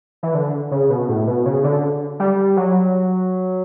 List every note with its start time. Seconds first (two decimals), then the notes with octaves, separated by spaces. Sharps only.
0.23 E3
0.34 D3
0.71 C#3
0.90 B2
1.08 A2
1.27 B2
1.46 C#3
1.64 D3
2.20 G3
2.57 F#3